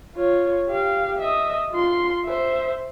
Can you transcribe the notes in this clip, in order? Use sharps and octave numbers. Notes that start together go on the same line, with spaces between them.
F4 C#5
G4 F5
D#5 E5
F4 C6
C5 E5